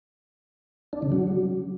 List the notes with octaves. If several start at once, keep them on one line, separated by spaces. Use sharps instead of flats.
D4
C#3
F#3